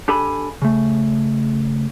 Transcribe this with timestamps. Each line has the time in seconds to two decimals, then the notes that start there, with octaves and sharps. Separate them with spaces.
0.08 D4 G4 A4 G#5 B5
0.62 C#3 A3